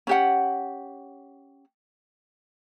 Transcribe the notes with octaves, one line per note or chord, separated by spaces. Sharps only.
C#4 G4 F#5